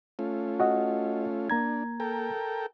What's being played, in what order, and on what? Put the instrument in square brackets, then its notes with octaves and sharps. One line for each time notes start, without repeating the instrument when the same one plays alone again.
[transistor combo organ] A3 C#4 F4
[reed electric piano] F#4 D#5 F#5
[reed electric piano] A#3 A#5 G#6 [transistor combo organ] D4
[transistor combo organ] A4 A#4 G5